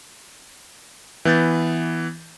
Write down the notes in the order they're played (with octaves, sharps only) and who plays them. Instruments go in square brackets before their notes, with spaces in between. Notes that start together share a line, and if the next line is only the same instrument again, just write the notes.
[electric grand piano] E3 B3 G6 A6